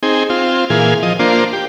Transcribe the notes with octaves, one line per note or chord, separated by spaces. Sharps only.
C4 D#4 G#4
C4 F4
A#2 E3 G#4 F5
F3 D#5
A#3 D4 F4 C5
G4